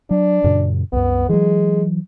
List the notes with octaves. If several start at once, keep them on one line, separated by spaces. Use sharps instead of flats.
F#3 D4
F#2 A#2 C#3
C2 F#2 B3
E3 F#3 G#3